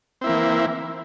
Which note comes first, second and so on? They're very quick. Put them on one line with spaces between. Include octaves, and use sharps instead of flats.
C4 E4 A#3 E3